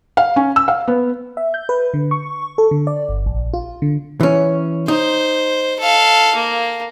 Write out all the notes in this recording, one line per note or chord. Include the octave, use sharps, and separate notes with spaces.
F5
C#4
E6
F5
B3
E5
G6
B4
D3
C#6
A4
D3
D5
G1
A#1
F4
D3
E3 C#4
D#4 C5
A4 F5
A#3